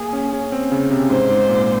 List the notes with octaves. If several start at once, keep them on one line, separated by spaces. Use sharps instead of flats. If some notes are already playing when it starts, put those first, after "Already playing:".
Already playing: A#3 G#4
C#4
C#4
C4
C#3
C3
G#2 C5
G#2
A#2